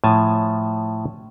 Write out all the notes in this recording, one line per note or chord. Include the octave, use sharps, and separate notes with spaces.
A2 F3 G#5 A5